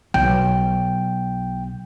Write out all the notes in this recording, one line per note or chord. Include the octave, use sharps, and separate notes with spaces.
B1 G5